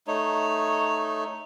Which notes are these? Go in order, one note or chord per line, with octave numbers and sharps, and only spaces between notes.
A3 D#4 C#5